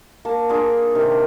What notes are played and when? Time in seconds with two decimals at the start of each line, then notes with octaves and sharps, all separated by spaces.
0.25 A#3 A5
0.49 D4 F4 G#4 A#4
0.95 C3 D#3 G4